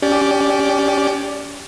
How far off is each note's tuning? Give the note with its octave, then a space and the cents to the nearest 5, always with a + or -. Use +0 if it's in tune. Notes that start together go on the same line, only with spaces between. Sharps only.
C#4 +30 G4 +0 D5 +0